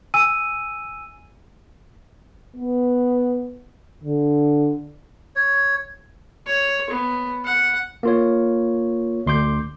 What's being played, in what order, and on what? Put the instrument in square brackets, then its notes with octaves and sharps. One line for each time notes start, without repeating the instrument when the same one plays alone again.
[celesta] G#5 E6 D#7
[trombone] B3
D3
[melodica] C#5
[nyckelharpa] C#5
B3
F#5
[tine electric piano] A#3 F4 C#5
D2 C6 D6 G6